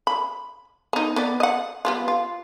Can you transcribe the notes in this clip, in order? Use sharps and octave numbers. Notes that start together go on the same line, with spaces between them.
B5
B3 D#4
B3 B4 D5
D#5 F#5
G3 B3 F4
F4